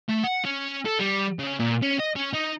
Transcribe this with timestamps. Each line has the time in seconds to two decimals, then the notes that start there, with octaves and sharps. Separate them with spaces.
0.09 A3
0.23 F#5
0.44 C#4
0.85 A4
0.99 G3
1.39 C#3
1.60 A#2
1.83 C#4
2.00 D#5
2.16 C#4
2.33 D#4